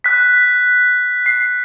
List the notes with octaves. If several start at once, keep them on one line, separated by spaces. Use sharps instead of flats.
F#6 B6
C7